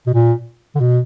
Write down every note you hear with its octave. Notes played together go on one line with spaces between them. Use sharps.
B2
A#2
D3
B2